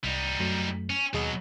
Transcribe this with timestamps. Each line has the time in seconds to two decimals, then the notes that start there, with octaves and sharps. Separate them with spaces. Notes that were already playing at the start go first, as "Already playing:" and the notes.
0.04 C2 G3 D#4
0.39 F#2 F#3 A3
0.90 C#4
1.14 D#2 B2 F#3 G#4 D#5